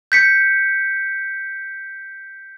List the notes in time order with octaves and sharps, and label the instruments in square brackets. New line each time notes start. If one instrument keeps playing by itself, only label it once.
[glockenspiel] G6 B6 C#7